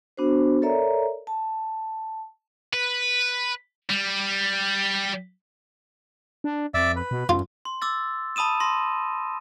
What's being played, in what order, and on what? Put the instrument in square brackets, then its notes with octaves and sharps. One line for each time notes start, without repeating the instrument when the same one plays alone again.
[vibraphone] B3 D4 F#4 C5
A4 A#4 C#5 D5 E5 A#5
A5
[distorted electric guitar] B4
G3
[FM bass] D4
[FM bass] F2 [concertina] D5 E5
[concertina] B4
[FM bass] B2
[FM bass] F#2 [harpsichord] F4
[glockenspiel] C6
D6 E6 A6
A5 B5 D#6 D#7 E7
C6 A#6